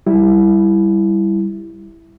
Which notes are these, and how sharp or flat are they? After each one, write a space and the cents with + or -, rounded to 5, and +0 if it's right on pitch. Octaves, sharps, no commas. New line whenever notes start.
G3 +0 E4 +0